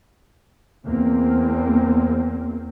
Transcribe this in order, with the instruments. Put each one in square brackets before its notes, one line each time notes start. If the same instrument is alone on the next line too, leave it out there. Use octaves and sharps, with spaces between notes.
[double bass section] E2 A#3 C4